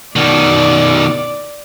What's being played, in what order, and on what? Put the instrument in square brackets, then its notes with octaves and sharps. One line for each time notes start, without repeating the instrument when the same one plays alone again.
[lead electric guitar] B2 D#3 [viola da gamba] D5